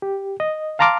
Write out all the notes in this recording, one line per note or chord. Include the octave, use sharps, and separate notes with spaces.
G4
D#5
F5 A5 A#5 C6 D6 F6